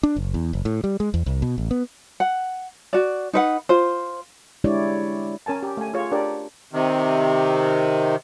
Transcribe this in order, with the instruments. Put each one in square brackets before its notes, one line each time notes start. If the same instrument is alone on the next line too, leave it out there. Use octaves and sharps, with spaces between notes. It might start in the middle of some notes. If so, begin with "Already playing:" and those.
[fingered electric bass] D4
F#1
E2
F#1
A2
G3
G#3
E2
C2
B2
A1
B3
[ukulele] F#5
F#4 D5
D#4 B4 F#5
F4 C5
[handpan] G#3 D4 E4 G4 C#5 D5
[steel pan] C#4 A#4 G#5 A5
G4
A3 G#5
F4 G#4 C#5
D4 G4 A#4 C#5 D5
[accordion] C3 D#3